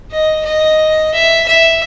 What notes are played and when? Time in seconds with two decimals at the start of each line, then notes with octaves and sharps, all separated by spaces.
0.12 D#5
0.45 D#5
1.14 E5
1.48 E5